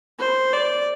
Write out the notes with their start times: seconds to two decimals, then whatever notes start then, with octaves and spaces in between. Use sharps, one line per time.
0.19 C5
0.53 D5